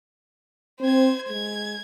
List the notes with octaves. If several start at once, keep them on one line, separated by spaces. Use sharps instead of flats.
C4 C5 G#6
G#3 G#6